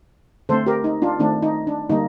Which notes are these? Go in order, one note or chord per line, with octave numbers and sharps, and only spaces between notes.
D3 A3 C4 A4 C5
G4 A#4
D#4
D4 F4
D#3 A3 C4 D4
D#4
D4
D3 G3 A#3 D#4